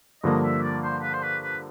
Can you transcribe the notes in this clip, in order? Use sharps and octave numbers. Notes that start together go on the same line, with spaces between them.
G2 D3 F3 A#3 D4 D#5
E5
D5
C5
B4
C5
B4
B4